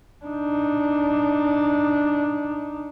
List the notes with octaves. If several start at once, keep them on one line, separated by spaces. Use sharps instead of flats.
D4 D#4